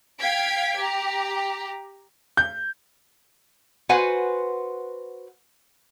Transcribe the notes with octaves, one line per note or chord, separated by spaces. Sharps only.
F5 G5 G#6 B6 D7
G4 A#5
G6
F#4 B4 C5 F#5 G#5